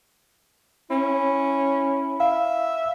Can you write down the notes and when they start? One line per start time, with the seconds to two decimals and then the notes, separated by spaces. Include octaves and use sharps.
0.91 C#4 E4
2.20 E5 F5